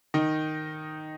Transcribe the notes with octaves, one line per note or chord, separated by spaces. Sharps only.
D#3 D#4